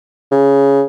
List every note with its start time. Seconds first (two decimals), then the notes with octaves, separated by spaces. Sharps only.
0.32 C#3